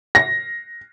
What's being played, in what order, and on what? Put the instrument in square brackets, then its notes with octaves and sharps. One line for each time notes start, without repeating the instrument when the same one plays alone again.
[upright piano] A#6